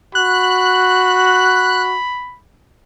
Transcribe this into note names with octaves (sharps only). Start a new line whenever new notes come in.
F#4 B5 F#6